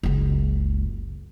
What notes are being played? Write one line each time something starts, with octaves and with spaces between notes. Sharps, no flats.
F#1 C#2